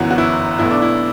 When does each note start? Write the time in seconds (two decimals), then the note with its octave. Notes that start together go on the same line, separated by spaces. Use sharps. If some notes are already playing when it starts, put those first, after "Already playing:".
Already playing: G1 F#2 E3 B3 F#4
0.11 F#4
0.18 E4
0.59 B1 B2 A3 E4
0.71 D4
0.82 E4